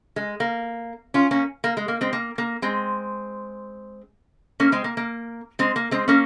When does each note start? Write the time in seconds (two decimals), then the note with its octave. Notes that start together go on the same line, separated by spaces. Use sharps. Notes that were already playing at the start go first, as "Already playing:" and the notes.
0.16 G#3
0.40 A#3
1.14 C#4 F4
1.31 A#3 C#4
1.64 A#3
1.77 G#3
1.88 A#3
2.01 G#3 C4
2.13 A#3
2.38 A#3
2.62 G#3 C4
4.60 A#3 C#4
4.72 G#3 C4
4.84 A#3
4.97 A#3
5.59 G#3 C4
5.76 A#3
5.91 G#3 C4
6.08 A#3 C#4